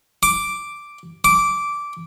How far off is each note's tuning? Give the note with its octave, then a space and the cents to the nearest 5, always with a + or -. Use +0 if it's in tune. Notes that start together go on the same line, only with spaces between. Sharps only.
D6 +0
D6 -10